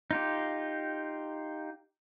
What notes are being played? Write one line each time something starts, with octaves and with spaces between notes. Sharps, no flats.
D#4 F4 G4